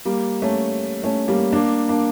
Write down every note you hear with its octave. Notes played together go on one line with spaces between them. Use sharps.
G3 A#3
A3 C#4
A3 C#4
G3 A#3
A#3 D4
A#3 D4